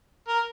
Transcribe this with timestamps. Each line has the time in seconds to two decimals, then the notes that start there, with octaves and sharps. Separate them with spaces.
0.28 A#4